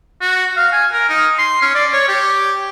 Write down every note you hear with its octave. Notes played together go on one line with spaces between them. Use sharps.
F#4
F5
G#5
A#4
D#4
C6
C#4
D5
C#5
G4